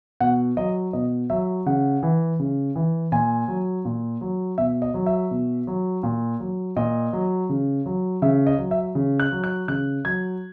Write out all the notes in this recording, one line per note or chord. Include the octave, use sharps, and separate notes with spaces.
B2 F#5
F#3 D#5
B2 D#5
F#3 E5
C#3 F#5
E3
C#3
E3
A#2 G#5
F#3
A#2
F#3
B2 E5
D#5
F#3
E5
B2
F#3
A#2
F#3
A#2 D#5
F#3
C#3
F#3
C#3 E5
D#5
F#3
E5
C#3
F#6
F#3
F#6
C#3 F#6
F#3 G#6